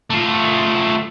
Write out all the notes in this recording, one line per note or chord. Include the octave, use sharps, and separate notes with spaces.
A3 F4